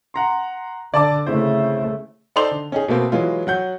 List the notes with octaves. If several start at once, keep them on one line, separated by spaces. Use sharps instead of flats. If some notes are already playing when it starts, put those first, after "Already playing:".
F#5 A#5 C6
D3 D5 A5 D6
C#3 A3 C4 E4 C5
D#4 A4 C5 D5 C6 F7
D3
C#4 D#4 G#4
B2 A3 A#3 C4
E3 F#3 G#3 F4
F#3 F#5 G6